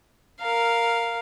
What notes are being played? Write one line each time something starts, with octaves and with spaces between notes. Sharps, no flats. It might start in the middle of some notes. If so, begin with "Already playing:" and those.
A#4 F5